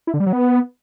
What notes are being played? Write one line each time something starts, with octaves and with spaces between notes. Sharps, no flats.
E4
D3
G3
F#3
B3